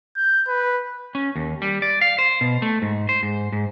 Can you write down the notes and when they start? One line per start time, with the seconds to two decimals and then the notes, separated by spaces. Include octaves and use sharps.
0.17 G6
0.48 B4
1.15 C#4
1.36 D#2
1.62 G3
1.82 D5
2.01 F5
2.18 C5
2.41 B2
2.62 A3
2.82 G#2
3.09 C5
3.23 G#2
3.52 G#2